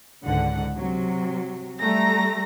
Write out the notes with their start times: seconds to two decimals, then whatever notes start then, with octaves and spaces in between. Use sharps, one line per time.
0.23 C#2 G#2 D3 F#5
0.77 C3 F#3
1.80 G3 A3 A#5 A#6